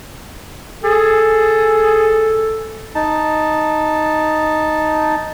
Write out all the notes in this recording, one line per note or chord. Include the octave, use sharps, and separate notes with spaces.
G#4 A4
D#4 A5